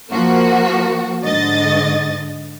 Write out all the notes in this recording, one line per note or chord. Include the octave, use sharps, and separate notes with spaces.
F3 A#3 F#4
G#2 D3 D#5 A6